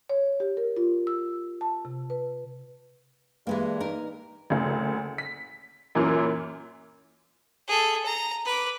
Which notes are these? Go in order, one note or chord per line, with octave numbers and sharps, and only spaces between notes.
C#5
G4
A#4
F4
E6
A5
C3
B4
G2 E3 G#3 A#3
D#4 A#4
F#1 D2
B6
F#2 A#2 E3
G#4 A4
A#5
B4 D6